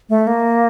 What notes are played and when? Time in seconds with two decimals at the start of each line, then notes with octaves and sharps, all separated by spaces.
0.09 A3
0.27 A#3